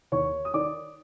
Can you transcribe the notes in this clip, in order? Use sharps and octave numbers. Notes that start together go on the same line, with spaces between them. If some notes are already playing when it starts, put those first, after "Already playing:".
D#2 C#5 C#6
D#6
D#3 D5 D6